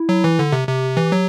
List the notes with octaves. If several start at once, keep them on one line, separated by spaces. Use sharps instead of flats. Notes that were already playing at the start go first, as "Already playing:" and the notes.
Already playing: E4
F#3
E3
D3
C3
C3 G4
E3 G4
F#3